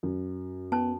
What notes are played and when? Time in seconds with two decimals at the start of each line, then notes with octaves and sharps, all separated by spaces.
0.03 F#2
0.72 B3 C#4 A5